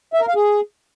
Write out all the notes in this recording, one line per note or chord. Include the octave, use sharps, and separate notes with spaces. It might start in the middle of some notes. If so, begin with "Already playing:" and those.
E5
A#4
F5
G#4